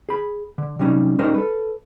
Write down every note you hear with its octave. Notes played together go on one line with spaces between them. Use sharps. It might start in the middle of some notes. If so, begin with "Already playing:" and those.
G#4 B5
D3
C3 F#3 G3 C#4 D#4
G3 C#4 D#4 A#4 C5 D#5
A4 B4